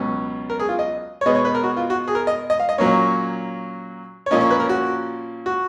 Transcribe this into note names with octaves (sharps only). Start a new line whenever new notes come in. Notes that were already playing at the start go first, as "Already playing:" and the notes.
Already playing: C#2 B2 F#3 C#4
A#4
G#4
F4
D#5
C#5
B2 G#3 B3 D#5
C#5
B4
A#4
F#4
F4
F#4
G#4
A#4
D#5
D#5
F5
D#5
A#2 F#3 A#3 C#4 C#5
C#5
A#2 F3 A#3 C#4 D#5
C#5
B4
A#4
F#4
F#4